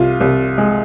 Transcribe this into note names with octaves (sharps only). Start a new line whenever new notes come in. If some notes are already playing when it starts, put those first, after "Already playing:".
Already playing: C2 F4
C2
G#3